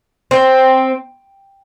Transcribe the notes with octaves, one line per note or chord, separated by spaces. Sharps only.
C4